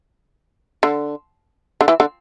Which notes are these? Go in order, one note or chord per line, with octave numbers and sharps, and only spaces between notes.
D3
D3
E3
D3